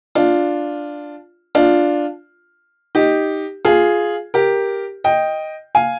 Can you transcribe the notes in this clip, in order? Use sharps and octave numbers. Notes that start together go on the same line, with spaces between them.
D4 F4
D4 F4
D#4 G4
F4 G#4
G4 A#4
D#5 G5
F5 G#5